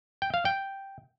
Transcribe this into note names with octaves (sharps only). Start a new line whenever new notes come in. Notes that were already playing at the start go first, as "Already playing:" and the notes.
G5
F5
G5